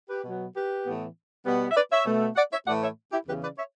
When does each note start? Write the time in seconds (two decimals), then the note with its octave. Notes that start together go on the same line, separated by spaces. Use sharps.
0.09 G4 B4
0.24 B2 F#3 B3
0.54 G4 B4
0.85 A2 E3 B3
1.46 B2 G3 B3
1.71 E5
1.76 B4 D5
1.90 C#5 E5
2.05 B2 A3
2.36 D5 F#5
2.51 C#5 E5
2.66 A2 E3 A3 D5 F#5
2.81 C#5 E5
3.11 E4 G4
3.26 E2 C#3 E3 G4 B4
3.42 B4 D5
3.57 C#5 E5